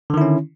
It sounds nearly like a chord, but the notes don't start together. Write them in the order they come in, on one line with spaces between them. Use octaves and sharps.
D3 D#3 E4 C#4